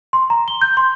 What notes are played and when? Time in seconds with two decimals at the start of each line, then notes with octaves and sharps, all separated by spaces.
0.13 C6
0.30 A#5
0.48 G7
0.61 G6
0.77 C6